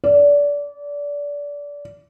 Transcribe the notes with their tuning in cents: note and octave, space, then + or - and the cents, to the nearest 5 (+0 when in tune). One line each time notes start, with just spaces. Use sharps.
D5 -25